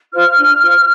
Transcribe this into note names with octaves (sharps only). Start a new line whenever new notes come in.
F4 C5 F6
D4
F4 C5